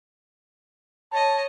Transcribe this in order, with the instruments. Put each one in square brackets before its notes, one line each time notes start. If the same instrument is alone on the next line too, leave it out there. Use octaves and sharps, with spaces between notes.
[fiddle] C#5 D#5 [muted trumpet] A5